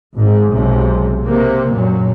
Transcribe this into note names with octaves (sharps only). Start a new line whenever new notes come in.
G#1 G#2
B1 G#2 C3
C3 A#3
F#2 A#2 F#3